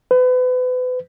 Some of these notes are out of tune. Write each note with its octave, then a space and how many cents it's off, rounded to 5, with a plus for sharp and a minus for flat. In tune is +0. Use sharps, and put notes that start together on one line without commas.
B4 +35